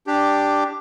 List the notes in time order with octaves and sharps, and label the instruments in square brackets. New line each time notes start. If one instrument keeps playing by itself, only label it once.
[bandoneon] D4 G4